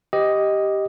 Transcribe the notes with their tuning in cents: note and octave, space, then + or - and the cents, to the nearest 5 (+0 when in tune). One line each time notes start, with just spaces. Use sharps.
G4 +0 C5 -40 D#5 +5